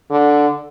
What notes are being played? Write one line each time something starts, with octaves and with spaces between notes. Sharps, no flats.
D3